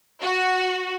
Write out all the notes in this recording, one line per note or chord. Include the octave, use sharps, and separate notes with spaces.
F#4